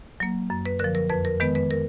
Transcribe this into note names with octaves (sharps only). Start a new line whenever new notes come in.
F#3 A#3
F#2
B4
D3 F3 A#4
A#4
F2 B4
A#4
D#3 G#3 B3 B4
B4
A#4